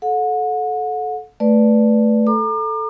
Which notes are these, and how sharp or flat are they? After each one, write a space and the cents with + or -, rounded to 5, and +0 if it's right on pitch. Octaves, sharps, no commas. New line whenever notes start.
A4 -20 F#5 -35
A3 +0 B4 +0 D5 +0
A4 +0 A#5 +0 D6 +40